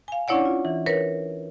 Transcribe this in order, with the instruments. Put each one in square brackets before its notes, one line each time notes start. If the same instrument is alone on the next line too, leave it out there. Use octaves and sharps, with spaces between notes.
[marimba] F5 G#5
C#4 D4 E4 C#5 D5 F#5
F4
E3
A#4 B4 C#5